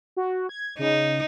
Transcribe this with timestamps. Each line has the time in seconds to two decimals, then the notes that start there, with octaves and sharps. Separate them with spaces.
0.17 F#4
0.49 G#6
0.79 C#3 D#4